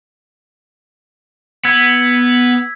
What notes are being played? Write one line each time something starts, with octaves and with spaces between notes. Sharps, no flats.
B3 E6 G#6 B6